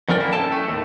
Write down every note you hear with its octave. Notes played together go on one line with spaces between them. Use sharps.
F2 F3 C#4 A#4 D5 G5
A#3 E4
F#2 A2 C#4 A4 G5 A5
A3
D#2 A2